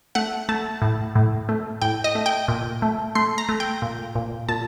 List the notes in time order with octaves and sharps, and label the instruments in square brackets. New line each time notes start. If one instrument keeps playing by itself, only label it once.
[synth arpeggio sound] A3 F#5
A3 A5
A2
A2
A3
A2 G5
D#5
A3
G5
A#2
A3
A3 C6
A#5
A3
G5
A#2
A#2
A#2 A5